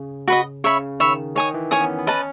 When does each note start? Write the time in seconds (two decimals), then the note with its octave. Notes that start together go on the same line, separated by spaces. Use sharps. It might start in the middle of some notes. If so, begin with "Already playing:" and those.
Already playing: C#3
0.28 F#4 B4 D#5
0.64 C#3 C#5 E5 B5
1.00 D#3 C#5 E5 B5
1.36 D#3 C#5 G#5 D#6
1.54 E3
1.71 C#4 C#5 G#5 D#6
1.81 B3
1.99 B3
2.07 C#4 B4 D#5 A5